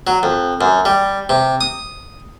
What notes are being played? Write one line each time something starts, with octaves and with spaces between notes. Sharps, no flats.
F#3
F2
F#2
G3
C3
D#6